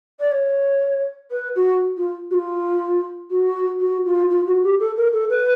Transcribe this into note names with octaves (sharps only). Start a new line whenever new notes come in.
D5
C#5
B4
F#4
F4
F#4
F4
F#4
F#4
F4
F4
F#4
G4
A4
A#4
A4
B4